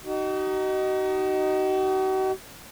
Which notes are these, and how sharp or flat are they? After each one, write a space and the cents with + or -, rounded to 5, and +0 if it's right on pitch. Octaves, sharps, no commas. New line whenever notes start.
D#4 -5 F#4 +45